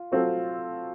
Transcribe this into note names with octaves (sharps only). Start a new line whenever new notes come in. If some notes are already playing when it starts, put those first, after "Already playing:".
Already playing: F4
F#3 C4 F4 A4